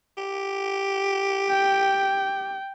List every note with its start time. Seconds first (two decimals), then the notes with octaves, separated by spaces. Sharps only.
0.18 G4
1.50 G5